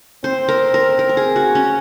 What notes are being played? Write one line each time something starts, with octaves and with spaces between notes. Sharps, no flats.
C4 C5
A#4
A#4
A#4
A#4
G#4
F#4
C#4